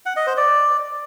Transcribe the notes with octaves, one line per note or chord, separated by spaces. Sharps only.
F#5
D#5
C5
D5